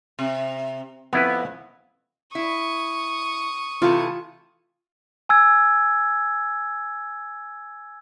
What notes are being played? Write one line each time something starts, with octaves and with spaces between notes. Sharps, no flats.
C3
F2 B3 E4 B4
E4 C#6 D#6
C3 E3 A3 F4
G#5 E6 G#6